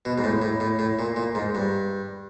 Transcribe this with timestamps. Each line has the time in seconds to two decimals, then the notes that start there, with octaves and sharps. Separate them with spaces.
0.05 B2
0.18 G#2
0.24 A2
0.42 A2
0.60 A2
0.79 A2
0.99 A#2
1.16 A#2
1.35 G#2
1.55 G2